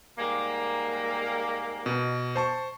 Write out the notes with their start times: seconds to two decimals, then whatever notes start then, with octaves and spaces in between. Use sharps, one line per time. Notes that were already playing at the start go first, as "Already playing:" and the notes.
0.18 G#2 G3 A#3
1.86 B2
2.36 C5 A5 C#6